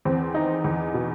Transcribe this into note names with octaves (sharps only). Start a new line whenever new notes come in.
E2 C4
D#3 D#4
E2
B2